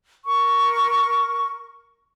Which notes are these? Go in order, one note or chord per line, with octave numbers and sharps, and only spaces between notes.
A#4 C#6